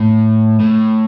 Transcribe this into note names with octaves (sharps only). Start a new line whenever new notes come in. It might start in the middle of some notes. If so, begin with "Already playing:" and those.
Already playing: A2
A2